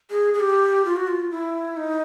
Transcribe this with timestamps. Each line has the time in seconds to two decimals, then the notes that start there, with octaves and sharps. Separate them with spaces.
0.11 G#4
0.34 G#4
0.40 G4
0.85 F4
0.96 F#4
1.07 F4
1.31 E4
1.77 D#4